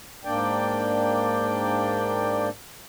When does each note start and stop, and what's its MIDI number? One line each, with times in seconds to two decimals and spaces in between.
0.25 2.49 44
0.25 2.49 58
0.25 2.49 62
0.25 2.49 74
0.25 2.49 79